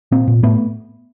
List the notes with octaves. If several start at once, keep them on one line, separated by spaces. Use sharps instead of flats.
A#2 A#3 C4
A#2
A2 A3 B3